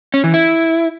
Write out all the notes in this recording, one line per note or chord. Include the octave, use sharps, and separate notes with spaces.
C#4
E3
E4